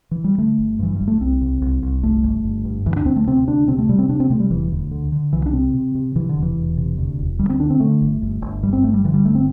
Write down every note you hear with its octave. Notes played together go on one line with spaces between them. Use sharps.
E3
G3
D3 A3
G1
G2 E3
G1 G3
A3
C2 C4
C2
C2
C2
G1 A3
G1
G1
G2
D2 E3
D4
D2 C4
A3
C3 C4
D2 D4
C3 C4
A3
C3 G3
C4
C3 D4
C4
C3 A3
G3
E1 E3
D2
D3
D3
C2 E3
D4
C3 C4
C3
C3
C3 E3
D3
E1
E3
E1
C3
D2
E1
D2 G3
C4
D3 D4
C4
D3 A3
G1
G1
G1
G2 G3
C4
G1 A3
G3
D3 E3
G3
G1 A3
C4